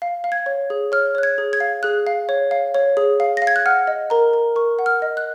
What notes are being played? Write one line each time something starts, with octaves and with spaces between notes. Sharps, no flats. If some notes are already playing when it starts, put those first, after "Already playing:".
F5
F5
G#6
C#5
G#4
C#5 F6
C#5 F#6
G#6
G#4
G#6
F5
G#4 F#6
F5
C#5
F5
C#5
G#4
F5
A#6
F5
G#6
F#6
F#5 F6
D#5
A#4 A#5
A#4
A#4 C#6
F#5
F6
D#5
F#6